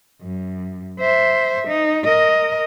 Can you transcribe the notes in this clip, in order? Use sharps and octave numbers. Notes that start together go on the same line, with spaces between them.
F#2
C5 E5
D#4
A#4 D#5